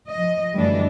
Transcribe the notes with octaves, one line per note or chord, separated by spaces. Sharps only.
F3 D#5
F#2 D3 E3 G3 A3 D4